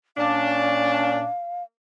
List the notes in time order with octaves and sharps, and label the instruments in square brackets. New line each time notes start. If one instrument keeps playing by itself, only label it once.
[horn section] A#2 C#4 D4 [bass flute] F5